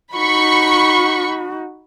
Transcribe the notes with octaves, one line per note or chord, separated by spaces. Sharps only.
D#4 F#4 B5 C#6